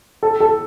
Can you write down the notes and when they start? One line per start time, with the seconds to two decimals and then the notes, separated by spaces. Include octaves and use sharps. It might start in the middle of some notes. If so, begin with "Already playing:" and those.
0.23 A4
0.40 A4